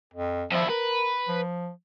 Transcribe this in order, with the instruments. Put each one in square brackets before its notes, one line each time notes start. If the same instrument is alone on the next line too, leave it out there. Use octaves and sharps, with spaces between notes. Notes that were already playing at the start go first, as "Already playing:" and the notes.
[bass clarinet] F2
[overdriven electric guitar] F2 E4 [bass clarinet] F3
[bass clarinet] A#4 [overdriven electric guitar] B4
[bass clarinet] F3